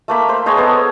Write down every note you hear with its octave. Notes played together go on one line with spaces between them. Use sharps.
A3 A#3 B5
C5
G#3 C5 C#5 D#5
B3 A4